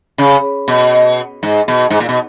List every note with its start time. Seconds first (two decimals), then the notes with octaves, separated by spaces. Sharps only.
0.18 C#3
0.68 B2
1.43 G#2
1.68 B2
1.90 G#2
2.00 A#2
2.09 B2